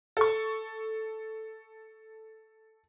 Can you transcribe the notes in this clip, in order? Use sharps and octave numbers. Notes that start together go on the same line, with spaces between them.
A4 C#6